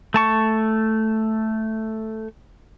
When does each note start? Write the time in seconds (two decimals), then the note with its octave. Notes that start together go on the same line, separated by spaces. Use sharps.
0.14 A3 A5 C#6